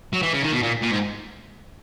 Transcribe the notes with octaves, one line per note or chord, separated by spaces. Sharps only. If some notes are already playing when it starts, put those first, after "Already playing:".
F#3
E3
C#3
D#3
B2
A#2
A#2
G#2